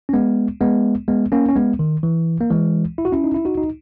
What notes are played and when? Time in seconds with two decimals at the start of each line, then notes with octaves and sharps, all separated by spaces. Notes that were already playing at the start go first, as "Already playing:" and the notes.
0.09 C#4
0.13 G#3 B3
0.61 G#3 B3
1.08 G#3 B3
1.32 A#3 C#4
1.48 C#4
1.56 G#3 B3
1.79 D#3
2.03 E3
2.41 A#3
2.50 E3 G#3
2.98 E4
3.05 F#4
3.12 C#4 E4
3.24 D#4
3.34 E4
3.45 D#4 F#4
3.57 D#4